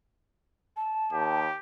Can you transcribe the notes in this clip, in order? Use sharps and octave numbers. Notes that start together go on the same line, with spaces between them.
A5
D#2 G4